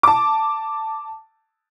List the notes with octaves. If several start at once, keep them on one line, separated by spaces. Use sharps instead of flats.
A5 D6